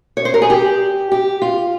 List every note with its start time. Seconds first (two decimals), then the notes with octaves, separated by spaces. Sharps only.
0.17 C#5
0.25 C5
0.34 A#4
0.42 G#4
0.50 G4
1.12 G4
1.42 F4